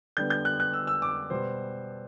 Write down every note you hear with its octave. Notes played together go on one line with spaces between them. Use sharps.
D3 G3 B3 G6
G6
F#6
F#6
E6
E6
D6
B2 G3 B3 C5